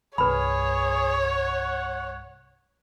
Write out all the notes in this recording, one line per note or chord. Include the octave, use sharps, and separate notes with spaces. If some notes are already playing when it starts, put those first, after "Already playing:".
C2 G2 G#4 B4 C#5 B5
F#5